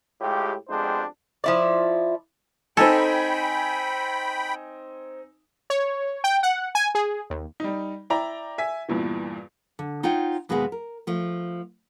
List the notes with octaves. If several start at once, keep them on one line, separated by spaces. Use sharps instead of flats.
A2 G#3 F4 G4
F2 G#3 B3 D4 G4 C5
F3 E4 D5
C4 D#4 A4 G5 G#5 B5
C#5
G5
F#5
G#5
G#4
D#2
G3 D#4
E4 D5 G5 A#5
E5 G#5 B6
E2 G2 A#2 E3
D3
D#4 F4 C#5 F#5 G5
D#2 B2 G#3 A#3 B3 G#4
A#4
F3 A3